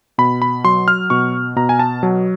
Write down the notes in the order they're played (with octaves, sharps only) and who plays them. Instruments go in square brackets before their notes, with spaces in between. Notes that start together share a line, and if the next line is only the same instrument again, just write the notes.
[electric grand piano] B2 B5
B5
F#3 C6
F6
B2 C#6
B2 A#5
G#5
A5
F#3